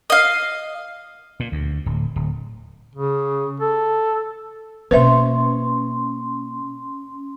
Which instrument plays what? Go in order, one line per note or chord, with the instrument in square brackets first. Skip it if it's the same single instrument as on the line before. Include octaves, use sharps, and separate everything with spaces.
[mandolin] D#5 F5
[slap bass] A#2
D2
D1
D1
[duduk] C#3
A4
[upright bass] B2 A#3 [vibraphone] C#4 C6 [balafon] B4 C5 E5